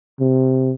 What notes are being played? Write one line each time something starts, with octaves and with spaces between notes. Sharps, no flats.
C3